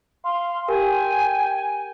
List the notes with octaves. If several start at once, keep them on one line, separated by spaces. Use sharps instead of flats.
F5 C6
G4 A#4 G5 G#5